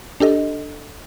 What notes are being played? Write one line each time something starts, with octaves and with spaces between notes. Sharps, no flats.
D4 G4 A4 D#5